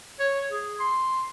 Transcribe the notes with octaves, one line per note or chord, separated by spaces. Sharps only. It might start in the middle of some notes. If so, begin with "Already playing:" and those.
C#5
G#4
C6